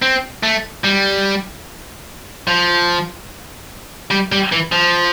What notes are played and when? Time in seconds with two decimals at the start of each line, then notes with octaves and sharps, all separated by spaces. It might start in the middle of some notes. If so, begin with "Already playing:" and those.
0.02 C4
0.43 A3
0.84 G3
2.48 F3
4.11 G3
4.32 G3
4.52 E3
4.72 F3